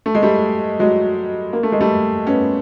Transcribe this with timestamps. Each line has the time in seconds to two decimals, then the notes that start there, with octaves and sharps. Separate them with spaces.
0.06 A3
0.15 G#3
0.23 G3 A3
0.79 F#3 G#3
1.53 A#3
1.63 A3
1.72 G#3
1.80 G3 A3
2.27 B3 C#4